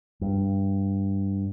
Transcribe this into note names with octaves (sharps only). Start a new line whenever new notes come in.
G2